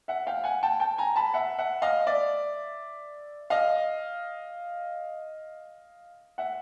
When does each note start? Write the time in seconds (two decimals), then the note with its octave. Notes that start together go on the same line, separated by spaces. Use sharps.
0.08 E5 F#5
0.27 F5 G5
0.44 F#5 G#5
0.63 G5 A5
0.80 G5 A5
0.98 G#5 A#5
1.16 A5 B5
1.34 E5 F#5
1.58 E5 F#5
1.82 D#5 F5
2.07 D5 E5
3.50 D#5 F5
6.38 E5 F#5